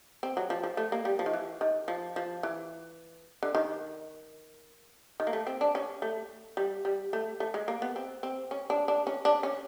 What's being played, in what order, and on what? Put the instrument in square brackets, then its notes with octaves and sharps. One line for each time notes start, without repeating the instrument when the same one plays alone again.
[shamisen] C4
F#3
F3
F3
A3
A#3
G3
F3
D#3
E3
D#3
F3
F3
E3
D3
D#3
D#3
A#3
A3
C4
D4
C#4
A3
G3
G3
A3
A3
G#3
A#3
B3
C4
C4
C#4
D4
D4
C#4
D4
C#4